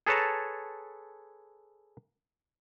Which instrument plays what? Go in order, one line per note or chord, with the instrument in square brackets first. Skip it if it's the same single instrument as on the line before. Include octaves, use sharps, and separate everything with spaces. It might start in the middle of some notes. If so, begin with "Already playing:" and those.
[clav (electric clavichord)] G#4 A4 B4 C#5 A5 A#5